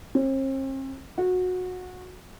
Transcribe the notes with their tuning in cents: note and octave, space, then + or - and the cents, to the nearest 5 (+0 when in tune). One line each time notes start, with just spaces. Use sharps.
C4 +45
F#4 -20